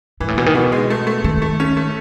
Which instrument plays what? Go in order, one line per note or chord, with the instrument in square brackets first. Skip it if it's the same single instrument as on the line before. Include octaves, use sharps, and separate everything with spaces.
[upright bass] G#2 [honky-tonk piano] E3
[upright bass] A2
[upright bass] B2 [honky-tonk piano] E3
[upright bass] D#3
[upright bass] B2 [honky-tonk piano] B3
[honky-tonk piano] G#3
A3
A3
[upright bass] D#3 [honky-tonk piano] A3
[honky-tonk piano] A3
C#4
A3